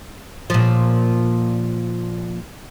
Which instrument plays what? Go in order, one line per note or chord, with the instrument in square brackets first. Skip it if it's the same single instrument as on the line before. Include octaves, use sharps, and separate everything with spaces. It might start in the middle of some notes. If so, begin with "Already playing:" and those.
[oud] A#2 F3